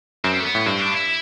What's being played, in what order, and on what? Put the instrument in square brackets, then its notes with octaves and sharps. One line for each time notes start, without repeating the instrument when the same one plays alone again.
[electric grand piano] F#2 [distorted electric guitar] C4
[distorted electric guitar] A3
B3
[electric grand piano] A2
[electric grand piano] G2 [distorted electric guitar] C4
[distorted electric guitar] D4
E4